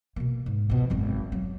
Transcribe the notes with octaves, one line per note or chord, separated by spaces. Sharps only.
B2 A#3
G#2
B2 F3
G#1 F#2
F#3